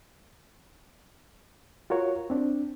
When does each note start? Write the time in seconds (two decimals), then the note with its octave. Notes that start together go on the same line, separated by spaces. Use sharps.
1.90 F4 F#4 A#4 C#5
2.30 C4 D4